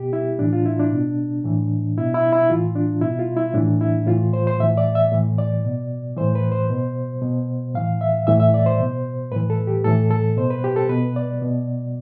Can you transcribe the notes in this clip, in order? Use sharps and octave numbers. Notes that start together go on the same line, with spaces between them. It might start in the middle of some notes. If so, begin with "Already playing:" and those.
Already playing: B2 G4
E4
A2 E3 D4
F4
E4
D4
B2
A2 E3
B2 E4
E4
E4
A2 E3 F4
D4
B2 E4
F4
E4
A2 E3 D4
E4
A2 E3 F4
C5
C5
A2 E3 E5
D5
E5
A2 E3
D5
B2
A2 E3 C5
B4
C5
B2
B2
A2 E3 F5
E5
A2 E3 E5
E5
D5
C5
B2
A2 E3 B4
A4
G4
A2 E3 A4
A4
B2 C5
B4
G4
A4
B2 B4
D5
B2